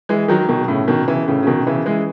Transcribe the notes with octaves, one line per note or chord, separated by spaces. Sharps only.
E3 G#3
D#3 F#3
B2 D#3
A2 C#3
B2 D#3
C#3 E3
A2 C#3
C#3
B2 D#3
C#3 E3
E3 G#3